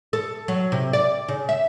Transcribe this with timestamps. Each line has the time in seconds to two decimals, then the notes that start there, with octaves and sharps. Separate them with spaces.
0.13 A4
0.48 F#3
0.72 C3
0.93 D5
1.28 C#3
1.49 E5